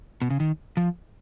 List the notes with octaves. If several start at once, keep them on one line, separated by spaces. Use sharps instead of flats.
B2
C#3
D#3
F3